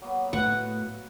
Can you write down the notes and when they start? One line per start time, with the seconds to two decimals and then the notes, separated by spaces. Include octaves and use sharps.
0.02 F#3 A#3 B3
0.33 A2 A3 F#4 B4 F#5